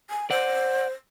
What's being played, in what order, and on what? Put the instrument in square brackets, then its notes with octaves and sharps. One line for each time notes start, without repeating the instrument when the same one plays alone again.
[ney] G#5
[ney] C5 [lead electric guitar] D5 F#5